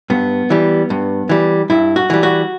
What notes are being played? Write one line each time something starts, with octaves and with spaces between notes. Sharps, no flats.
G2 B3
E3 G3
G2
E3 G3
G2 E4
F#4
E3 G3
F#4